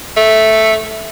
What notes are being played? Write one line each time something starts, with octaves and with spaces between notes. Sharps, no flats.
A3